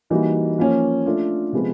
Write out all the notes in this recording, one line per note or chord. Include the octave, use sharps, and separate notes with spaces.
E3 G3 A#3 D#4 F#4
F3 A#3 C#4
A3 D4 F4 A4
C3 F3 G#3 B3